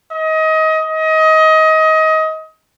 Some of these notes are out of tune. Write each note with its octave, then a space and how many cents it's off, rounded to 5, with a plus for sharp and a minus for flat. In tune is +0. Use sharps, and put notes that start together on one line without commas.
D#5 +25
D#5 +25